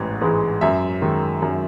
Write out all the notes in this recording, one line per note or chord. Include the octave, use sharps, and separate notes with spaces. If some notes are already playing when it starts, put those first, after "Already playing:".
Already playing: A1 G#2 E3
G#2 E3 G#3
F#2 E5
D#3 G#3
F#2